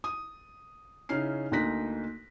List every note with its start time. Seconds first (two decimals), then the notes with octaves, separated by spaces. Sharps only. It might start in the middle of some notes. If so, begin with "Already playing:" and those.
0.04 D#6
1.09 C#3 C#4 D#4 E4 F6 C7
1.52 D2 A#3 D#4 F#6 A#6 B6